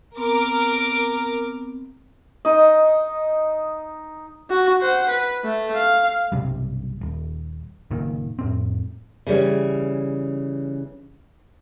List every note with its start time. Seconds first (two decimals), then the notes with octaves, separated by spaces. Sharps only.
0.17 B3 C4 A#4 D6
2.45 D#4 D#5
4.50 F#4
4.81 C5 F#5
5.09 B4
5.45 A3
5.75 F5
6.32 B1 G2 C3 G3
7.01 D#1
7.91 F#1 A#2 D#3
8.39 F2 A2 C4
9.27 C#3 E3 G3 C#4